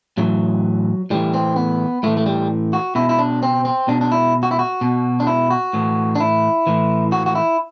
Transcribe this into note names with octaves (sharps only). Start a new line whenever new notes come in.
A2 E3 F#3
A2 E3 G3
C4
B3
A2 E3 A3
A3
G3
F#4
B2 E4
E4
D4
C4
C4
B2 D4
D4
E4
F#4
E4
F#4
B2
D4
E4
F#4
A2 E3
D4
E4
A2 E3
F#4
F#4
E4